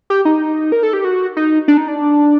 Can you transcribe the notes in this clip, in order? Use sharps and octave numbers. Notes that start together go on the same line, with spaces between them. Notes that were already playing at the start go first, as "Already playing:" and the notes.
G4
D#4
A#4
A4
G4
F#4
D#4
D4
D#4
D4